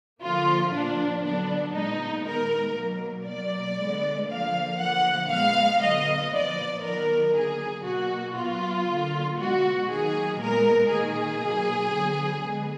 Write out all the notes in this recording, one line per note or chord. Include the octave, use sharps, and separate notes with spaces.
D3 F3 A#3 F4
A#2 F3 A#3 D4
D3 F#3 B3 D4
A#2 G#3 B3 D#4
D#3 G#3 B3 A#4
B2 F#3 A#3
B2 F#3 A#3 D5
D3 G#3 B3
D3 F3 A#3 F5
D3 F3 A#3 F#5
A#2 G#3 B3 F5
D3 F#3 B3 D#5
A#2 F3 B3 D5
D#3 F#3 B3 A#4
D3 F#3 A#3 G#4
B2 A#3 F#4
A#2 F#3 B3 F4
D3 F#3 A#3
B2 G#3 B3 F#4
D#3 F#3 A#3 G#4
A#2 G#3 B3 A#4
D#3 A#3 G#4
B2 F#3 A#3
D3 F#3 B3
D3 G#3 B3